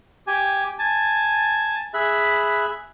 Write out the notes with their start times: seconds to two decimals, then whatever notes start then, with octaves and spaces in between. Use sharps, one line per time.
0.27 G4 G#5
0.79 G#5 A5
1.94 G#4 E5 B5 F#6